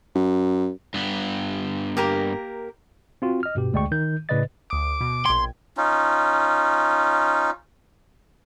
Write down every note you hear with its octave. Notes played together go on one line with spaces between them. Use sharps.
F#2
G2 B3
A#3 G4 A#4
C4 F4 F#4
D#5 F6
G2 B2 G4
D2 G#3 D5 G5 C#6
D#3 G6
A2 C#3 B4 D5 D#5 A6
D2 D6 D#6
B2
A#1 G5 C6 G#6
C#4 D#4 F4